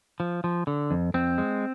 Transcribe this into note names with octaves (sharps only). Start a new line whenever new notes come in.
F3
F3
D3
F2
F2 C4
G#3